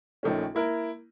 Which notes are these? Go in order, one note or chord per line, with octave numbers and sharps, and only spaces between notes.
A#1 D#3 A3 C#4
A#3 E4 A#4